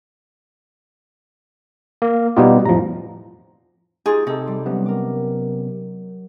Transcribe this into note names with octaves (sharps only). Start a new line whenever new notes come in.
A#3
B2 G3 B3 D#4 F4 G4
F2 A2 F3 A#5
D#4 F4 G4 G#4
C3 D#4 A4
G3 D5 C6
C3 F#3 B3 C#4
A#4 D6